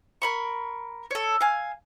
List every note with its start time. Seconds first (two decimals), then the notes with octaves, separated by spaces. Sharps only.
0.22 A#4 B5 C#6
1.11 A4 C#5
1.41 F5 G#5